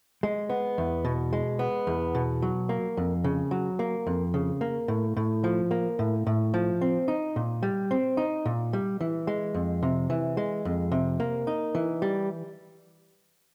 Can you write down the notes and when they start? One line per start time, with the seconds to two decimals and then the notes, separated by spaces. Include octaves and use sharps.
0.23 G#3
0.50 B3
0.78 E2
1.05 B2
1.33 G#3
1.59 B3
1.87 E2
2.15 B2
2.42 F#3
2.69 A#3
2.97 F2
3.24 C#3
3.51 F#3
3.79 A#3
4.07 F2
4.34 C#3
4.61 A#3
4.88 A2
5.17 A2
5.44 F3
5.71 A#3
5.99 A2
6.27 A2
6.54 F3
6.81 C4
7.08 D#4
7.36 A#2
7.63 G3
7.91 C4
8.17 D#4
8.46 A#2
8.73 G3
9.01 E3
9.27 G#3
9.54 F2
9.83 C3
10.10 E3
10.37 G#3
10.65 F2
10.92 C3
11.20 A#3
11.47 D#4
11.75 E3
12.02 G3